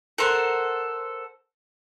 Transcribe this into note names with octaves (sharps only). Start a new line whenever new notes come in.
A4 A#4 C5 F#5